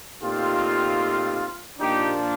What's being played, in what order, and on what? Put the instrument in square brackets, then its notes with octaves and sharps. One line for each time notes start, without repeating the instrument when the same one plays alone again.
[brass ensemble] A#2 A3 C4 D#4 G4 [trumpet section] F4
[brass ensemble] A#2 F3 A#3 D4 [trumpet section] D#4 G4